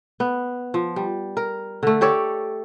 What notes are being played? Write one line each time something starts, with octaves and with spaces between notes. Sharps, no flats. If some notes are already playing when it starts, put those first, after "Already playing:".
B3
F3
G3
A#4
D3 A3
G4 A4 C#5 D5